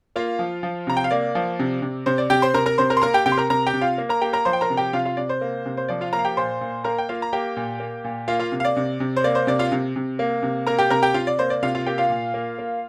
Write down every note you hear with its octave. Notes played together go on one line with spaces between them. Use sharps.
A#3 F4 F5
F3
F3
C3 A#5
G5
F5
A#3 D5
F3
C3
C3
C3 C5
D5
C3 G4 G5
C5 C6
C3 A#4 A#5
A#4 A#5
C3 C5 C6
A#4 A#5
C6
A#3 A#4 A#5
G4 G5
C3 G4 G5
C6
A#4 A#5
C3 A#4 A#5
G4 G5
C3
F4 F5
A#3
A#4 A#5
A#3 G4 G5
A#4 A#5
F3 C5 C6
G5
A#4 A#5
C3
G4 G5
C3 F4 F5
F4 F5
C3 D5
C5
A#3
C3
C5
F3 D5
F4 F5
A#3 A#4 A#5
F5
G4 G5
A#2 C5 C6
A#2
A#3 A#4 A#5
G5
A#3 F4 F5
A#5
A#3 G4 G5
A#2
A#3
A#2
A#3 F4 F5
F4 F5
C3
F5
D5
C3
C3
C5
A#3 D5
C5
C3 D5
F4 F5
C3
C3
A#3
C3
A#3 A#4 A#5
G4 G5
C3 A#4 A#5
G4 G5
C3 F4 F5
D5
A#3 C5
D5
C3 F4 F5
F4 F5
A#3 G4 G5
F4 F5
A#2
A#3
A#3